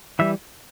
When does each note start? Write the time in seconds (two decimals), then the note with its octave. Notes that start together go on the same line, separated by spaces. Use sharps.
0.19 E3 G3 E5